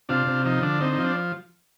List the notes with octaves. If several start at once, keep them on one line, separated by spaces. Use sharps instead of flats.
C3 D4 F4
C3
F3 D#4
D3 D4
C4 D#4
D#4
F3
D4